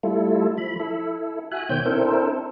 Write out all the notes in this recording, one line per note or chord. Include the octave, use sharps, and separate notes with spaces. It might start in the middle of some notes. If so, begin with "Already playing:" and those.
G3 A3 E4 F4 A4
F3 B5
E4 A4
F#4 E5 G#5 F#6
B2 D#3 C5 C#5 G5 G6
C4 D4 E4 A4 A#4 C5